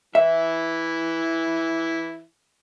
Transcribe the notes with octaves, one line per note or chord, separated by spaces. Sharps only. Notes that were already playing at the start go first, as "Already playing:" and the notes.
E3 E4 E5